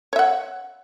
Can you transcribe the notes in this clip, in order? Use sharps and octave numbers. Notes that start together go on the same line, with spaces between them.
C#5 E5 F#5